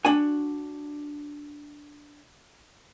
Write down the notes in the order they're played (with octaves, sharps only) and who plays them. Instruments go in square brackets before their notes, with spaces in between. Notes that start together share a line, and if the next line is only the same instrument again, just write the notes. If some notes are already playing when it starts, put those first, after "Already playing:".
[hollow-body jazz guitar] D4 F#4 G#5